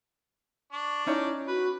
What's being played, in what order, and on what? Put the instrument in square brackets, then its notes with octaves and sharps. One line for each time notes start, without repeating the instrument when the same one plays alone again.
[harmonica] D4 D5 [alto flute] C#6
[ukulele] C#4 D#4 C#5 [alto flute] E4
[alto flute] F#4 [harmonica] B4